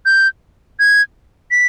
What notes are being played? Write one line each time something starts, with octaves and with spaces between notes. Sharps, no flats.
G6
G#6
B6